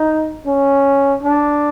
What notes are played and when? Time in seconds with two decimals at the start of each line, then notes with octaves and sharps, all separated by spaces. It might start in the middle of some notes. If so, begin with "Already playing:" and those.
Already playing: D#4
0.46 C#4
1.23 D4